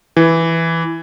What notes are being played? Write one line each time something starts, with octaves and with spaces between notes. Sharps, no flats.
E3